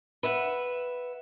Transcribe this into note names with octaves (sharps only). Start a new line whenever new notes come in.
B4 E5 F#5